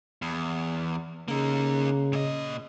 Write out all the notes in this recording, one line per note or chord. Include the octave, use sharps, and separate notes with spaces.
E2
C#3 A#3 D#4
A#2 D#5